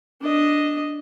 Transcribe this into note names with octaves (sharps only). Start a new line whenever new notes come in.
D4 D#5